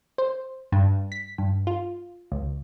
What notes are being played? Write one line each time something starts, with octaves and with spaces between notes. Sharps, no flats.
C5
G2
B6
G2
F4
C#2